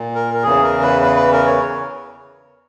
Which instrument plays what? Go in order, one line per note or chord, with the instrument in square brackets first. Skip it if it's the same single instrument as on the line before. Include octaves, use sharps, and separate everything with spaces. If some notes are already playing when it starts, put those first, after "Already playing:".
Already playing: [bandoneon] A#2
A#4
A#4
E2 C#3 E3 G#4
A#4
B4
B4
B4
A#4
C#5